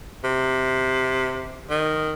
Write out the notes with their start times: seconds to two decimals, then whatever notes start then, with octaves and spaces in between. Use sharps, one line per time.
0.24 C3
1.70 D#3